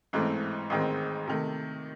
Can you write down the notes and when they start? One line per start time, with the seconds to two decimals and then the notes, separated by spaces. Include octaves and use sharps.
0.13 A1 G#2 E3 A3 C4
0.70 A1 G#2 D#3 G#3 C4
1.27 C3 D#3 A3